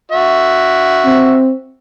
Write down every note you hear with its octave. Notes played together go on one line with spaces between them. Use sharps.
F#4 E5
C4